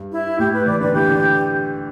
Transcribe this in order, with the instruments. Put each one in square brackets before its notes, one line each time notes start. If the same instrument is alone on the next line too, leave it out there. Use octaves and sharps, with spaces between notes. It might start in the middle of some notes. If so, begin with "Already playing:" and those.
Already playing: [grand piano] G2
[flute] E4
[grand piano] A2 [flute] G4
[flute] B4
[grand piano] E3 [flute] D5
[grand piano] D3 [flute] B4
[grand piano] E3 [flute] G4
[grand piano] D3